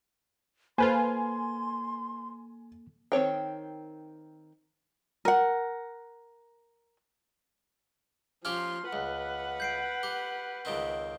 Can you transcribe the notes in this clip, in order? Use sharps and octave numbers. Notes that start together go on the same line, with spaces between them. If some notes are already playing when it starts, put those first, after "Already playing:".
A#3 F4 A4 B4 C5 G#5 C6
D#3 C4 C#5 G5
A#4 F#5
F3 C#4 F4 G4 C6 F6
C#2 B4 F#5
G6 C7 D7
G4
C#2 D#3 C4